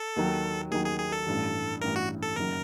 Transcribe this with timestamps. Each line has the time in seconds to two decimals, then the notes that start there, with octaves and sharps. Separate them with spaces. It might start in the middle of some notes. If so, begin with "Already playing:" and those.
Already playing: A4
0.16 D#2 D#3 F#3
0.71 D#2 D#3 F#3 G#4
0.85 G#4
0.99 G#4
1.12 A4
1.27 A1 G2 E3
1.81 A1 G2 E3 A#4
1.96 F#4
2.23 A4
2.36 F#1 F#2 D#3 F#3 A#4